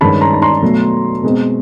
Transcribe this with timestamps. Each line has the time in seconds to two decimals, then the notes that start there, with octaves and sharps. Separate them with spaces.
0.01 G2 D#3 G#3 C#4 A5 B5
0.21 A#5 C6
0.33 B5
0.42 A#5 C6
0.62 B2 F#3 A3
1.23 B2 G#3 C4